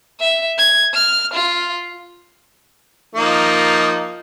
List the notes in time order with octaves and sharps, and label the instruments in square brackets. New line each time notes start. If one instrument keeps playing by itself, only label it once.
[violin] E5
G#6
F6
F4
[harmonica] F3 A#3 D#4